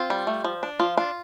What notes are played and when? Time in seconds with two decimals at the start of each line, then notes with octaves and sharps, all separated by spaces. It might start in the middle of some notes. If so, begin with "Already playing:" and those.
Already playing: C4 F4
0.10 G3
0.27 A3
0.44 F3
0.63 D4
0.80 F3 F4
0.97 D4 F4